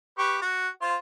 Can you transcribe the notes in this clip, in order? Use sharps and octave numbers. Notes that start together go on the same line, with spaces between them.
G4 B4 C#6
F#4
F4 C5 C6